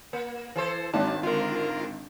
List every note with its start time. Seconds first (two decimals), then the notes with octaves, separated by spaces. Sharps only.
0.13 A#3
0.56 E3 A4 C5
0.94 G#1 D#3 F#3 D4 A5
1.23 D3 F4 A#4